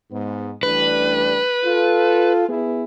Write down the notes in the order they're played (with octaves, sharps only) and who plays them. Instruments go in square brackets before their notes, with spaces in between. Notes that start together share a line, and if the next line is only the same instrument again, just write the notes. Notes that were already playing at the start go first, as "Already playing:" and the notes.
[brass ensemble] G#2 B3
[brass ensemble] A1 G3 D4 [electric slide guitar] B4
[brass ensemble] F4 A4
B3 E4 G#4